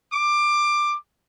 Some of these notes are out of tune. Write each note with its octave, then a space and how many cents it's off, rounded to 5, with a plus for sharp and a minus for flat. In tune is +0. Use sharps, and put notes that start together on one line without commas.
D6 +15